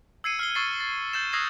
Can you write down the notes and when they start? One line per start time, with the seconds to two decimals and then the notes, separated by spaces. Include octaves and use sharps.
0.24 E6 G#6 C7 C#7 D#7
0.39 F6 C7 G7
0.55 C#6 E6 A6 C7
0.80 A6
1.13 E6 G6 A6 E7
1.33 D#6 E6 F#6 G#6 A#6 C7